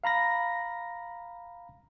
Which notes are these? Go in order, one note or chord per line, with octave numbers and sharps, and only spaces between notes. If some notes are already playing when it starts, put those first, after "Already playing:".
F5 A#5 B5 A#6